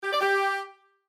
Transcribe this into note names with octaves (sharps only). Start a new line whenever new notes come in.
G4
D5
G4